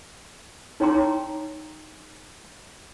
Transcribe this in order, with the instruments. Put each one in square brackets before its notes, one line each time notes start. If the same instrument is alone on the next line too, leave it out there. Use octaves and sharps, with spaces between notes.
[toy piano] D#4 C#5 G5 A#5 C6 D6